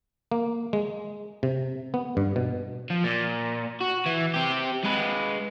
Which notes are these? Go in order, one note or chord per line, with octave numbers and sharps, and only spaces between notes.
A#3
G#3
C3
B3
G2
B2
F3
A#2
F#4
E3
C4 G4
G#3 B4